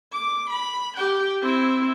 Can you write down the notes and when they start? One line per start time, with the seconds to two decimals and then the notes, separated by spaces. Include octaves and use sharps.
0.13 D6
0.50 B5
0.97 G4 G5
1.42 C4 E4